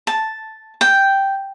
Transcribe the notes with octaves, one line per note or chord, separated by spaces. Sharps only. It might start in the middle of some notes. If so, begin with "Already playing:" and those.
A5
G5